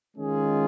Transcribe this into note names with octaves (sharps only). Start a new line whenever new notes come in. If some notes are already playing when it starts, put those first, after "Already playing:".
D#3 G#3 C#4 F4 G#4